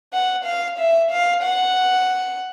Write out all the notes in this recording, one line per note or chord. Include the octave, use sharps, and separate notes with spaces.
F#5
F5
E5
F5
F#5